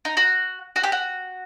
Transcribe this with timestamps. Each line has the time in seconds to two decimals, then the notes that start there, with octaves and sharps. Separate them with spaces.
0.05 D#4
0.17 F#4
0.76 F#4
0.83 G4
0.92 F#4